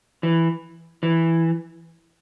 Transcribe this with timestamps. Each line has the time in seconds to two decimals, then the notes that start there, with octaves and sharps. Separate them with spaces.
0.23 E3
1.03 E3